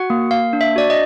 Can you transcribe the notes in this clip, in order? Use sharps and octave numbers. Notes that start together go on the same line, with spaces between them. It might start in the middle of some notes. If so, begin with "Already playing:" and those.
Already playing: F#4 F#5
A#3
A#3 F5
D4
E5
F#4 D5
D#5